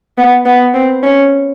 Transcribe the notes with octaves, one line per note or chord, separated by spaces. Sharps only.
B3
B3
C4
C#4